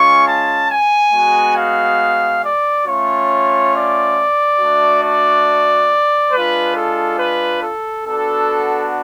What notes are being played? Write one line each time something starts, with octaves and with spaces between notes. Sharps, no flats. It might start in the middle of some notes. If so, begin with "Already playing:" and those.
Already playing: G#3 C#4 F4 C#6
A5
G#5
G#3 B3 F#4
F5
D5
A3 C#4 F4 C#5
D5
A3 D4 F#4
D5
G#3 D4 F4 B4
A4
B4
A4
B3 D4 F#4 A4